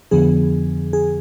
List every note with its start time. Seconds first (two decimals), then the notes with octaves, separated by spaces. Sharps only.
0.11 F2 D3 F3 B3 G#4
0.93 G#4